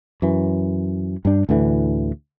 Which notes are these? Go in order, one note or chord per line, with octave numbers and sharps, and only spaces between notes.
F#2 E3
G2 D4
D2 A2 D3 E3